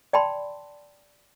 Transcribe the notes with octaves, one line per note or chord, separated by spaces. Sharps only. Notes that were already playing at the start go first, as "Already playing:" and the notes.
D5 G5 A5 B5 C6